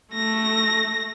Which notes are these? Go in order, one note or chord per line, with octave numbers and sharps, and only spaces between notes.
A3 A#6